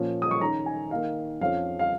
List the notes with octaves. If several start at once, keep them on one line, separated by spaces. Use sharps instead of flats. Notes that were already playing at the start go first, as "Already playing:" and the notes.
Already playing: A#2 F3 C#4
D#6
C#6
D#3 C#4 A#5
G#5
D#3 A#3 D#4 F5
F2 F3 C#4 F5
F5